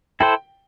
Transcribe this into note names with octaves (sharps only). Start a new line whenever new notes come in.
E4 A4 C5 G5